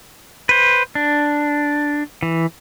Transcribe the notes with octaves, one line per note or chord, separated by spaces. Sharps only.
B4 C5
D4
E3